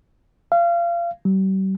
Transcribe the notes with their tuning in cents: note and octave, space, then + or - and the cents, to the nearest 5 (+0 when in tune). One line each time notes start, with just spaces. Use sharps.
F5 -30
G3 -40